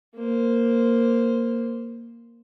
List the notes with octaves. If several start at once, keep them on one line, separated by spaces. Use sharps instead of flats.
A#3 C5